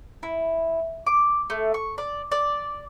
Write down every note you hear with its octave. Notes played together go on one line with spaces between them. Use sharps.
E4
D6
A3
C#6
D5
D5